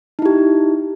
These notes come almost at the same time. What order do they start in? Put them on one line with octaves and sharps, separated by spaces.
D#4 E4 G4